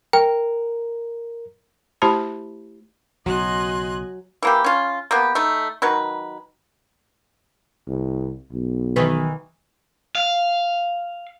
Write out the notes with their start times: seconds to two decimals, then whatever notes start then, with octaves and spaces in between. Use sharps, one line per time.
0.13 A#4 G5
2.02 A3 E4 G4 C5 A5 B5
3.26 B1 C#3 F#3 D#5 G#5 C6 F#6
4.42 E3 A#3 G4
4.64 C#4 F4
5.11 A#3 B3 G4
5.35 A3 D#4
5.82 D#3 F#3 B4
7.88 C2
8.53 B1
8.96 D#3 E3 B4
10.15 F5